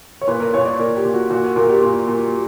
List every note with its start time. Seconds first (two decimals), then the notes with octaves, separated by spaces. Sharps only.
0.21 C#5
0.28 A#2 B4
0.40 A#4
0.54 A#2 C#5
0.66 D5
0.79 A#2 A#4
0.96 G4
1.04 A#2
1.14 F#4
1.30 A#2 F#4
1.44 A#4
1.56 A#2 A#4
1.69 G4
1.82 A#2 A#4
2.08 A#2